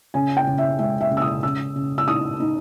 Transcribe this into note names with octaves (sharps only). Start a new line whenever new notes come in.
C#3 G#5
G5
C#3
E5
G#3 E5
E5
C#3
E6
D#6
C#3 E6
C#3
E6
D#4 D#6
D#4